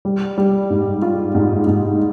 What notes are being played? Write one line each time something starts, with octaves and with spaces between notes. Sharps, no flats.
G3
G3
G#2
F4
G#2
G#2